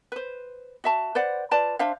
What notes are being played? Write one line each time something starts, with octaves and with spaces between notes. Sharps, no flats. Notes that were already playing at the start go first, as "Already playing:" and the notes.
B4 C5
F#4 E5 A5
B4 C5 D5 F#5
F4 B4 D5 A5
D4 C5 E5 F5